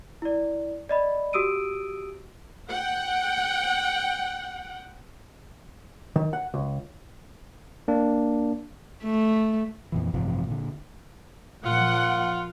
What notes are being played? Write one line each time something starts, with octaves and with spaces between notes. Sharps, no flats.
E4 D5
D5 D#5 B5
F#4 G4 D#6 E6 D7 D#7
F#5 G5
D#3
F#5
C#2
A#3 D4
A3
F2 A#2 E3
A1 G2 C3 F3
A#2 D3
A#2 F3 F4 F#5